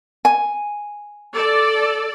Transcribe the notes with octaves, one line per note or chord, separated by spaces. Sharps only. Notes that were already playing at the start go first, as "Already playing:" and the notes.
G#5
A4 D5